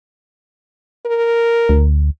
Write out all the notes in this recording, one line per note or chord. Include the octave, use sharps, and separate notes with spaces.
A#4
D2